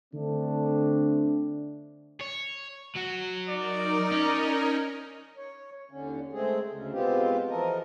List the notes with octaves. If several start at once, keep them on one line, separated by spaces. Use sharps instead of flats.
D3 A3 C4 D4
C#5
F#3 F#4
D#4 A#4 D5
C#4
C#5
D#2 D3 C#4
G#3 A3 C4 G#4
D2 C#3
B2 G#3 B3 C4 F4 G4
E3 F3 A4 A#4 D#5